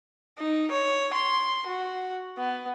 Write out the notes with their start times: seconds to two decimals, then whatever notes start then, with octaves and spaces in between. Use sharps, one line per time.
0.39 D#4
0.71 C#5
1.13 C6
1.67 F#4
2.38 B3